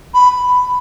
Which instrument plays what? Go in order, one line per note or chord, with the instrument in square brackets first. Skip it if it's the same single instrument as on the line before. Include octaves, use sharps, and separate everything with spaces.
[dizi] B5